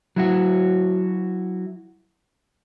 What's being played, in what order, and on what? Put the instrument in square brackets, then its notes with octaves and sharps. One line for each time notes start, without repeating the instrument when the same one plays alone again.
[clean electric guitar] F#3 E4 F#4